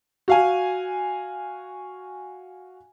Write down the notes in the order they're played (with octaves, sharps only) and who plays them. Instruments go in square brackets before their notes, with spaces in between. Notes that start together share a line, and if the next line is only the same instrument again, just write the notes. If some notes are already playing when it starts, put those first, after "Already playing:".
[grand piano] F#4 F5 G#5